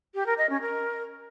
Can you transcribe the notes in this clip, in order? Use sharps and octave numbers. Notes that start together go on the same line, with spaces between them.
G4
A#4
D#5
C#4
A#4